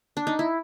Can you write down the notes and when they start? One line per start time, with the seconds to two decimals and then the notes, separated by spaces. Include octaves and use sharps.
0.17 D4
0.27 D#4
0.39 E4